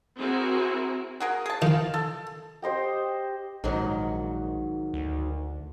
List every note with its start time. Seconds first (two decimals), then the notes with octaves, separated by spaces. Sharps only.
0.18 C4 E4 F#4 G#4 A#4
1.20 F#4 G#4 A#4
1.46 G#4 A5
1.62 D#3 F4 F5
1.94 A4
2.62 G4 C5 D#5 G5
3.64 A#1 G#2 D#3 F#3
4.94 D2